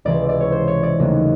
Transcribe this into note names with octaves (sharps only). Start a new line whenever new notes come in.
C#2 C3 E3 G#3 D5
D5
C#5
C5
C#5
D5
D#2 C#3 F#3 A3